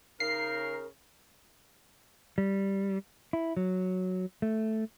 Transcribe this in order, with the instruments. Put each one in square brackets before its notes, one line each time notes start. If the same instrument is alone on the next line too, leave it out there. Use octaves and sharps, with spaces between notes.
[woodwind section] C#3 D#4 A#4 [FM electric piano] C7
[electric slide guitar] G3
E4
F#3
A3